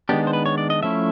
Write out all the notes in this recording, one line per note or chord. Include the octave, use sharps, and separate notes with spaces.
D#3 G#3 B3 D4 G4
C5
B4
C#5
D5
D#5
F3 A3 C#4 E4 E5